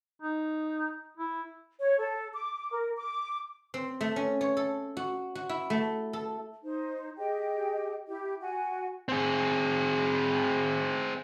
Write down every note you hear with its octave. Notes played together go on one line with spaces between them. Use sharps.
D#4
E4
C#5
A4
D6
A#4
D6
C4
A3
C#4
C#5
A4
F#4
F#4
E4
A3
A4
D#4 C5
G4 G#4 D#5 G5
E4 G4
F#4 F#5 G#5
C4 G#4